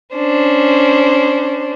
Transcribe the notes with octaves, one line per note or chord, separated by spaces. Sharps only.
C#4 D4 C5